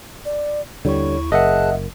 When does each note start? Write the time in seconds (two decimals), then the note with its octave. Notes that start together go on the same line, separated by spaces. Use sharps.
0.25 D5
0.85 D#2 D3 G3 E4 C#5 C#6
1.32 F#1 G#4 A#4 D#5 E5 F#5 A5 F#6